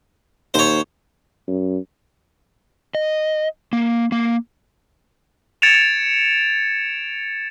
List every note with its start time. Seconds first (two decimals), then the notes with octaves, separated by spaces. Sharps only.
0.54 D#2 C5 C#5
1.48 F#2
2.95 D#5
3.73 A#3
4.12 A#3
5.62 G#6 A6 C#7 D7 E7 F7